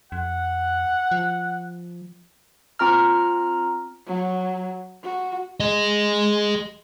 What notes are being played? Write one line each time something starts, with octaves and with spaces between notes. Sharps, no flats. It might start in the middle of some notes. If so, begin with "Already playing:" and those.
F2 F#5
F3
C4 F4 A#5 F6
F#3
F#4
G#4 D#5